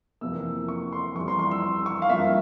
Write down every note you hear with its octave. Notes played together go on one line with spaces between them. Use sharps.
F2 C3 E3 A#3 E6
C#6
C6
F2 E3 G3 C#6
C6
C6
E6
C6
C#6
F5
G2 F3 A#3 E5